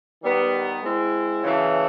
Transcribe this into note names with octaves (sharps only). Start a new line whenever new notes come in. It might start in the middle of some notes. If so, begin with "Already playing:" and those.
D#3 G3 B3
G#3 C4 E4
F#2 C#3 E3 A3